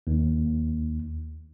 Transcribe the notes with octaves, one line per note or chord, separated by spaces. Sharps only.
D#2